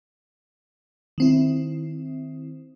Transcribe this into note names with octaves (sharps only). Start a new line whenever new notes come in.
D#3 C4 E4